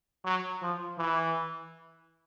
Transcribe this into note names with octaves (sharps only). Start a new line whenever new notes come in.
F#3
F3
E3